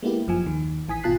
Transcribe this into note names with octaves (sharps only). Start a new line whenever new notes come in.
G#3 A#3 B3 E4 G4
G1 F#2 F3 G#5
D#2 D#3
A1 E3 G#5 D#6 B6
G#1 B2 F4 A5 F#6 C7